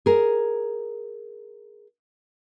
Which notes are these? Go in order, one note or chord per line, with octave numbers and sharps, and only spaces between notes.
G#4 A#4